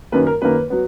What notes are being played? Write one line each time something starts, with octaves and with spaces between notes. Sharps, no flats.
F#2 D#3 A#3 B4
A#4
F#2 D#3 A#3 B4
F#3 B3